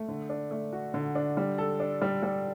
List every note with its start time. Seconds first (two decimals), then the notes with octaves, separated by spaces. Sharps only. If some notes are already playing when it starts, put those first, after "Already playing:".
Already playing: A3
0.09 D3
0.29 D4
0.51 A3
0.73 F#4
0.94 D3
1.15 D4
1.37 G3
1.58 A4
1.80 D4
2.02 G3
2.23 G3